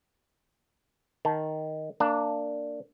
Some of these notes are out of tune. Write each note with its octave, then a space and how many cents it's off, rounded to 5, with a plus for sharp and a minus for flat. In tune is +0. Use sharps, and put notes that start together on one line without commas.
D#3 +0 A5 +0
A#3 -25 D4 +0